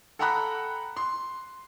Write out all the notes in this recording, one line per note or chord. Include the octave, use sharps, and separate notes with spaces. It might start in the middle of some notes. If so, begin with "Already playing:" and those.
A4 F#5 G5 A#5 B5 F#6
C6